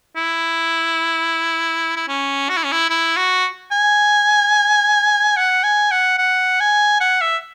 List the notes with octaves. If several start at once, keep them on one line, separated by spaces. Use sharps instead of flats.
E4
E4
C#4
F#4
E4
C#4
E4
E4
F#4
G#5
F#5
G#5
F#5
F#5
G#5
F#5
E5